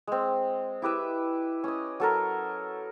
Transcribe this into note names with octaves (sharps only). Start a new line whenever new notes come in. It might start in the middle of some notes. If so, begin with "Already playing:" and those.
G#3 C4
E4 G4 B4 E5
C#4 D#5
F#3 A4 A#4